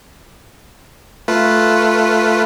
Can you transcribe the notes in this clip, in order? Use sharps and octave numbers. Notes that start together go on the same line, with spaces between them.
A3 F4 B4